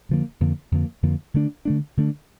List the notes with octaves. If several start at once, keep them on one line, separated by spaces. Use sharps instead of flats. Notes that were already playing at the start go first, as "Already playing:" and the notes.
F2 D3 F3 A#3
F2 D3 F3 A#3
F2 D3 F3 A#3
F2 D3 F3 A#3
D3 A3 D4
D3 A3 D4
D3 A3 D4